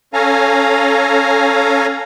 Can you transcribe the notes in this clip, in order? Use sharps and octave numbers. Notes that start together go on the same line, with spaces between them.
C#4 A4 F5 G#5 A#5